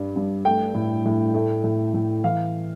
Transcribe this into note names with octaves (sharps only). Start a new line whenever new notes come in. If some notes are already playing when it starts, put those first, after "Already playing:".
Already playing: G2 G3
G2
A3 G5
A2
A2
A3
A2
A2
E3 F5